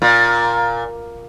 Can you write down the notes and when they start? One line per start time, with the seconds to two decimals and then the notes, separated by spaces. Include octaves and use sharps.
0.02 A#2